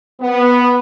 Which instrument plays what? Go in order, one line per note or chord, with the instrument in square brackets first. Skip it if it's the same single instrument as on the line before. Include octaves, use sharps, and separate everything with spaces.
[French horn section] B3